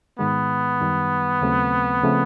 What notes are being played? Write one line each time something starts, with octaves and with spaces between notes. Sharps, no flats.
G#2 D#3 G#3 B3
F#2 D#3 G3
D#2 C#3 F#3 A3 C4
C#3 F3 A3 C4